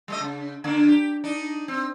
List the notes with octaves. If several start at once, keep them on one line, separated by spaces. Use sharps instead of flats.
G3 A3 D#5
C#3
D3 A#3 D4
G4
D4 D#4
C4